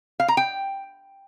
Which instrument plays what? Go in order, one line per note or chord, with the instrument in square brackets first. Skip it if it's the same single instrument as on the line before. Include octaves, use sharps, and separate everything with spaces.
[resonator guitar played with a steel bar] F5
A#5
G5